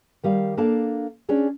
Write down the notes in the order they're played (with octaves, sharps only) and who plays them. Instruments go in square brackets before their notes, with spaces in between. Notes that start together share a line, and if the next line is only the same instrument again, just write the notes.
[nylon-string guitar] D#3 G3 F5
A#3 D4 A4 F5 A5
C#4 D4 G#4 C#5 D5